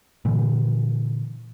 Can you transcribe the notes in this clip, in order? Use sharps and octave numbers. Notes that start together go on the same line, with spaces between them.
A#2 D3 E3